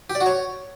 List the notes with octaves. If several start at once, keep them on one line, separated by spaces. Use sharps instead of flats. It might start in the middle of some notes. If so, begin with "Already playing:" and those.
G4
D5
F#4
C#5